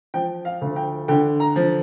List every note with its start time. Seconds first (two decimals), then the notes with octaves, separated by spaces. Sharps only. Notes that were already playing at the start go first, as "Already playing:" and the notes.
0.14 F3 G5
0.45 F5
0.61 D2
0.76 G5
1.08 D3 G5
1.40 A#5
1.56 F3